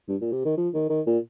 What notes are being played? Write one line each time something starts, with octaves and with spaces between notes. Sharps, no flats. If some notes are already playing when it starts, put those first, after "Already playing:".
G2
A#2
C3
D#3
F3
D#3
D#3
A#2